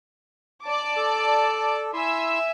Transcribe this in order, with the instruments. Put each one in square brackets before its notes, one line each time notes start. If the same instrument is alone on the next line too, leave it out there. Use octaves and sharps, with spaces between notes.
[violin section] D5 A5 D6
[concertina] A4
[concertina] E4 C6 [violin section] E5 G#5 E6